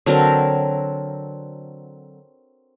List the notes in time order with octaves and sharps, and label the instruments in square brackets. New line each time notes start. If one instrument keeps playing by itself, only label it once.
[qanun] D3 F#3 C4 A#4